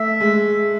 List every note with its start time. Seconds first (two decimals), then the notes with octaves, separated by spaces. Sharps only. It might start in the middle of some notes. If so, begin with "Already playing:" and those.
Already playing: A3 E5
0.20 G#3